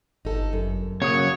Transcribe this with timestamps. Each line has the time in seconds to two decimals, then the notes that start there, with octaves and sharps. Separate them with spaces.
0.25 G1 D#4 A4
0.53 F#2
1.02 C#3 F#3 A#3 C#5 D#6